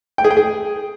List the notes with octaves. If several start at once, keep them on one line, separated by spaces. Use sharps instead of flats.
G5
G#4
G5
G#4